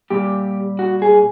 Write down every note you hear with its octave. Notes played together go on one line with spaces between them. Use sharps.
A#2 G3 G4
F#4
G#4